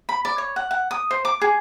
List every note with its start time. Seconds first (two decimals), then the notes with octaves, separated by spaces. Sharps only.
0.09 B5
0.25 D5
0.38 C#5
0.56 F#5
0.71 F#5
0.91 D#6
1.11 C5
1.25 D6
1.41 G#4